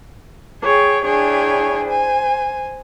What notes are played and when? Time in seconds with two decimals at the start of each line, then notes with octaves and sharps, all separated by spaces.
0.62 G#4 C#5 G5
1.03 D4 E4 G#4 C#5 G5 G#5
1.84 C5 G#5